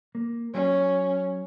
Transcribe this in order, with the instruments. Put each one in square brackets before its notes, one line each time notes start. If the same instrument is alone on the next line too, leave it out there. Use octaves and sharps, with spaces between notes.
[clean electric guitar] A#3
[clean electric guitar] F#3 [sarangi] C#4